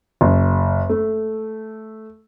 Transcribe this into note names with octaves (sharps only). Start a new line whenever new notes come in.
F#1
A3